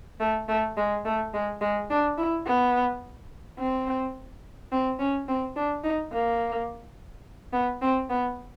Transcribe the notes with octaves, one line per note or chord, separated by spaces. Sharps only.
A3
A3
G#3
A3
G#3
G#3
D4
E4
B3
C4
C4
C#4
C4
D4
D#4
A#3
B3
C4
B3